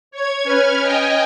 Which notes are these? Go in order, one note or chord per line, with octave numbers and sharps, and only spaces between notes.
C#5 G#6
C#4 B4 F6 G#6
D#5 G5 G#5